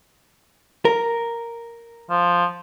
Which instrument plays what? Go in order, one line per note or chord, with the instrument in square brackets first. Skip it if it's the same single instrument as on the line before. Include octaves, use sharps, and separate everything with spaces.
[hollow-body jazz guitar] A#4
[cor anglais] F3